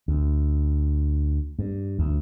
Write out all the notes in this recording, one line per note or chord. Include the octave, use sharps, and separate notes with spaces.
D2
G2
D2